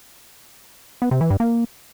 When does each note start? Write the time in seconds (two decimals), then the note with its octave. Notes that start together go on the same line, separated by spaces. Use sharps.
1.02 B3
1.11 C3
1.21 E3
1.30 G2
1.40 A#3